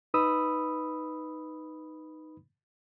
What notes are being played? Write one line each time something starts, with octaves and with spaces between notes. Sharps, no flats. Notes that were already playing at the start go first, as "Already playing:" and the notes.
D#4 B4 B5 D#6 E6